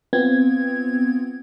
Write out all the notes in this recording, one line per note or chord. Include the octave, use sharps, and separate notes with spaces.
B3 C4 F4 G#6